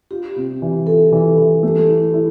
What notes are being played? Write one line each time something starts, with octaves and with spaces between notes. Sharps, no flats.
F4 G4
C3
E3
F4 A4
E3
E3
A3
E4
E4